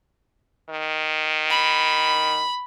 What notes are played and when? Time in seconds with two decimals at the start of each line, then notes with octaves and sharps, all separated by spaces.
0.70 D#3
1.50 B5